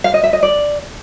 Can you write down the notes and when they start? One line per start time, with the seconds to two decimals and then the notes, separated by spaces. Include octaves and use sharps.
0.04 F5
0.14 D#5
0.23 E5
0.33 D#5
0.43 D5